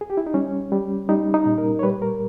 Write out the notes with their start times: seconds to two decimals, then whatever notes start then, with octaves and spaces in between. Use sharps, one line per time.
0.01 G#4
0.10 G4
0.17 E4
0.27 D#4
0.34 G3 C#4
0.72 G3
1.09 G3 D#4
1.34 D#4
1.46 A#2
1.58 A#4
1.79 C#5
1.83 G3 B4
2.02 A#4